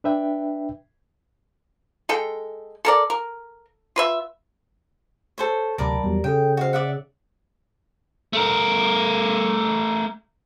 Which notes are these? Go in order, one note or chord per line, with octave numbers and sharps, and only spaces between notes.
D4 B4 E5 G5
G#3 A4 G5
A4 A#4 D5
A#4
F4 B4 E5
A4 C5 C#5
D2 C3 F#3 A#4 D5 A5 B5 D6
E2 F#3 G3 G4
C#3 C#4 G#4 A4 C#5 G5
F#4 C5 D#5 F5
C#5 D5 E5 F#5
A3 A#4